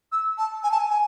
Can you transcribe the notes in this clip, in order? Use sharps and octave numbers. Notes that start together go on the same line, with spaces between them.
E6
A5
G#5
A5
G#5
G#5